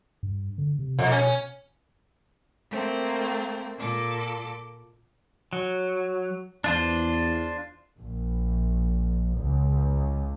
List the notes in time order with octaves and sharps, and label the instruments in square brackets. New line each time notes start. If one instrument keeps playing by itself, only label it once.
[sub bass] G2
D3
C3
[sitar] F2 [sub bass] B2
[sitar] C#4
[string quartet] A3 A#3 C4
A#2 A4 D6
[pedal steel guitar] F#3
[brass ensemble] E2 [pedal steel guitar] D4 F4 C5
[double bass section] A#1
C#2